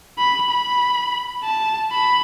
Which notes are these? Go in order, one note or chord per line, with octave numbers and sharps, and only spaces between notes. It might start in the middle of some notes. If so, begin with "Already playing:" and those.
B5
B5
A5
B5